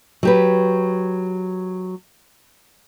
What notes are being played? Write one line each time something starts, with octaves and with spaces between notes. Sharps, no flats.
F#3 G4 B4